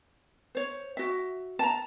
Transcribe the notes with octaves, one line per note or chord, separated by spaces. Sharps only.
C5 C#5
F#4 E5
A5 A#5